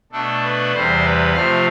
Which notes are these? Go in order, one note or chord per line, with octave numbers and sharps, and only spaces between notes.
B2 A3 D4 A4
B4
E2 C3 G3 C5
B4
C3 F3 A3 F5